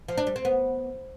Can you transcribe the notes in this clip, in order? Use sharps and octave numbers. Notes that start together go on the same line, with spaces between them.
F3
D4
G3
C4
B3